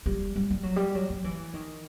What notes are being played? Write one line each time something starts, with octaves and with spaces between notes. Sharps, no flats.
G3
G3
G3
F#3
G3
F#3
F#3
E3
D#3